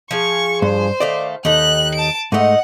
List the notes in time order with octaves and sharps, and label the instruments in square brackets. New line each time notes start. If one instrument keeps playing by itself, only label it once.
[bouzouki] F3 G#4 F5 [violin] C#6
[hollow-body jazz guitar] G2 [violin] C5
[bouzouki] D#3 A3 F5 [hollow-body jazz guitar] D5
[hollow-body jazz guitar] D#2 [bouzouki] D#4 G4 A4 [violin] F#6
[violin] A5 D7
[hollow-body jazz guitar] G#2 A3 [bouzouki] D#4 D#5 [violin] F#5